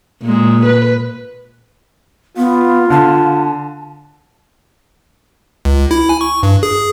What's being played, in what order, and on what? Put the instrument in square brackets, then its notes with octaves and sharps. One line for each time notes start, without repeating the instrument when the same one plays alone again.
[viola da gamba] A#2 G#3
B4
[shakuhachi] B3 [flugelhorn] F4
[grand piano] D3 [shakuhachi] A5
[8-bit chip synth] C#2
E4
G#5
C#6
G2
G#4